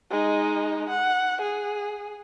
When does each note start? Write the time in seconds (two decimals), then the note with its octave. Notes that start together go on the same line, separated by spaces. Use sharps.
0.11 G#3 D#4
0.90 F#5
1.41 G#4